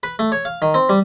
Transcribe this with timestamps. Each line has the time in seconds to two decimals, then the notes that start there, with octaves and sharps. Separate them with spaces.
0.03 B4
0.19 A3
0.32 C#5
0.45 F5
0.62 D#3
0.74 C4
0.89 G3